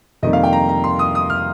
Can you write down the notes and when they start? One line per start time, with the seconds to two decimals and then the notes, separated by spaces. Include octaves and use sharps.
0.23 F2 C3 D#3 G3 A#3 D#5
0.33 F5
0.43 G5
0.53 A#5
0.69 A#5
0.84 C6
0.99 D#6
1.15 D#6
1.30 F6